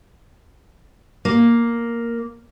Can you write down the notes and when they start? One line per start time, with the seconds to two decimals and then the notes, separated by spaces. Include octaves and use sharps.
1.25 A#3